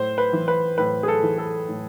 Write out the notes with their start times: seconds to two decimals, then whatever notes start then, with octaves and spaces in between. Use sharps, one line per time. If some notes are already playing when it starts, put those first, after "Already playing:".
Already playing: A2 C5
0.18 B4
0.33 E3
0.48 B4
0.78 A2 B4
1.03 G#4
1.08 A4
1.23 E3
1.38 A4
1.68 A2